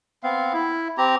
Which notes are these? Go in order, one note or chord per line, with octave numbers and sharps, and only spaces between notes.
B3 C4 F5
E4
C4 G4 A#5